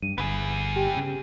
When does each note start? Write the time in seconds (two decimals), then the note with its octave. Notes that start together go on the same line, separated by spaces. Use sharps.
0.02 G2 D#7
0.18 G1 B3 G#4
0.76 G4 G5
0.97 C#3